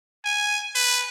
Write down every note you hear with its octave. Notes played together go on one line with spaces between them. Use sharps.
G#5
B4